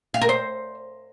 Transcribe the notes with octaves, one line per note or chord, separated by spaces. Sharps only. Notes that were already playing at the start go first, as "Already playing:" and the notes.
F5
A#4
C5